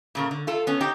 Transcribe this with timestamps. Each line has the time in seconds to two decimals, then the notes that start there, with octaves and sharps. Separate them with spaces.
0.15 A#2 C#3 A#4
0.31 D3
0.47 F4 A4
0.67 B3 C#4
0.80 C4 D#4 G4 G5